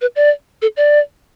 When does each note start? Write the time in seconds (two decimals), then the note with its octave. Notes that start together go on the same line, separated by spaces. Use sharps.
0.01 B4
0.16 D5
0.62 A4
0.77 D5